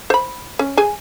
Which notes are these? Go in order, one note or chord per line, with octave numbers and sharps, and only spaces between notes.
C5 B5
C#4
G#4 G#5